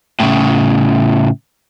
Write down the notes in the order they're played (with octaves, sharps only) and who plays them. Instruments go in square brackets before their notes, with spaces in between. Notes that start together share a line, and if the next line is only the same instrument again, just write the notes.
[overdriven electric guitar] A2 C#3